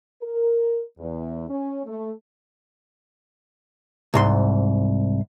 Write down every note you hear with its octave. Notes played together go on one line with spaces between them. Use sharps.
A#4
E2
C#4
A3
C2 G#2 C6